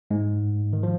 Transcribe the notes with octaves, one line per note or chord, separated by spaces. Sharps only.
G#2 G#3
D#3
F3